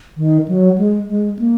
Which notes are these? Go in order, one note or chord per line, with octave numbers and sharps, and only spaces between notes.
D#3
F#3
G#3
G#3
A#3